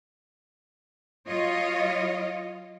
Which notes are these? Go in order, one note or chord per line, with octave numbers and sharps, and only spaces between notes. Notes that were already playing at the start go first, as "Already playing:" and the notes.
F#3 F4 C#5 D#5